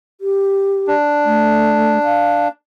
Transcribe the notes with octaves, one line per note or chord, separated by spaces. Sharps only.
G4
D4
A3
F5